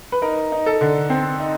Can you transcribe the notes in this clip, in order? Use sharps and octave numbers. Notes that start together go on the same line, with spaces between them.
B4
D#4 A#4
D#4
A4
D3
C4
D#4